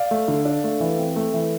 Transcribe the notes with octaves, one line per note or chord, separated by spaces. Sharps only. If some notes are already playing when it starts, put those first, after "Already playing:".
Already playing: D5 F5
A3
D3
D4
A3
E3
C4
A3
E3